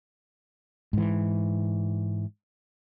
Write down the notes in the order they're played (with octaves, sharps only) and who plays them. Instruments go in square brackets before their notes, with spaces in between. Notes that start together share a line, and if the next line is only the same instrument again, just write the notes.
[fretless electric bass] G#2 E3